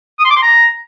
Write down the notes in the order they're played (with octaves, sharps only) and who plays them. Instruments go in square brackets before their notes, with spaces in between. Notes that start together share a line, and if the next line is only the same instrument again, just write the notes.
[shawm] D#6
C6
D6
C6
A#5